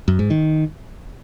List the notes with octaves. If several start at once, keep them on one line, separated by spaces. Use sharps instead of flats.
F#2
G#2
D#3